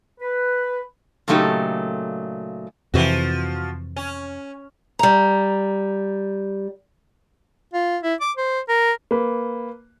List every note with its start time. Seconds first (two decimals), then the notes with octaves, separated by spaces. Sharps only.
0.20 B4
1.28 A#2 C#3 F#3 A3 D#4 G4
2.94 F2 C3 E3 F3 F#4
3.96 C#4
4.99 G3 A#5
7.74 F4
8.03 E4
8.21 D6
8.37 C5
8.69 A#4
9.11 A#3 B4